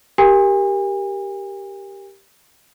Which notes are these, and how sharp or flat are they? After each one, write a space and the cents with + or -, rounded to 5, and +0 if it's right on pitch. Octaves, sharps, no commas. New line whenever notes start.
G4 +0 A#4 +0 G#5 -40